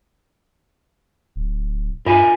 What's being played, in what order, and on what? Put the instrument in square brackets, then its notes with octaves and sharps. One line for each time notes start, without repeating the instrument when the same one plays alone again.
[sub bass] D1
[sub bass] G2 [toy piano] F4 [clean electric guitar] A#4 E5 G#5